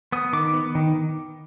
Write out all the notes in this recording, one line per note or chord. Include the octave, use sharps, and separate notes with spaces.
B3 D#6
D#3 D6
B3
D#3